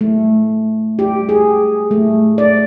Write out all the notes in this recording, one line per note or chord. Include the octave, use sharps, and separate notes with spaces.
A3
G4
G#4
A3
D5